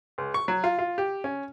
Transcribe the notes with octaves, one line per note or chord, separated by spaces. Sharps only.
C#2
C#6
F#3
F4
F4
G4
C#4